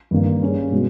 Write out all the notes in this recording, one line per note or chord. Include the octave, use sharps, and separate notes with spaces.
G2 D#3 A#3
G3 C#4 G#4
B2 G#3 B3